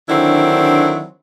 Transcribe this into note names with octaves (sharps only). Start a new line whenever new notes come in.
D3 D#3 F#3 C4 D4 E4